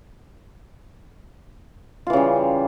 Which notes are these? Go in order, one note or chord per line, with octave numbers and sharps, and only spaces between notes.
C#3 E3 G3 F4